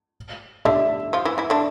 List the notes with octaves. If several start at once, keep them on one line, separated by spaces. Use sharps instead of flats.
D3 D4 E5
F3 F4
E3 E4
E3 E4
D3 D4